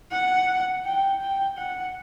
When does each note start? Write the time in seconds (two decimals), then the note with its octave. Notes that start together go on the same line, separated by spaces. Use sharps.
0.11 F#5
0.85 G5
1.21 G5
1.57 F#5